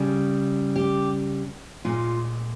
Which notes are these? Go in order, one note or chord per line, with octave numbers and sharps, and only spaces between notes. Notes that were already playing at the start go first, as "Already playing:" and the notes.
Already playing: C#3 G3
G4
A#2 G#3 F4